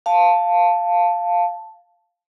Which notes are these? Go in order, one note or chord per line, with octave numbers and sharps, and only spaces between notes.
F5 A5